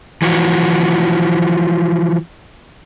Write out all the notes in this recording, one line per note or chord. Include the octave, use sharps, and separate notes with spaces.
E3 F3 F#4